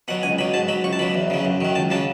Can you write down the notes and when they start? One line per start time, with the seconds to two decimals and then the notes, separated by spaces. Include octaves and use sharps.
0.08 B2 F#3 F#5
0.23 C#2 G#5
0.38 B2 F#3 B5
0.54 G#2 A5
0.68 F#3 B5
0.84 C#2 C#6
0.93 A5
0.99 B2 F#3 B5
1.15 E2
1.30 C#3 F#3
1.45 F#2
1.61 D#3 F#3
1.75 C#2 A5
1.90 C#3 F#3 A5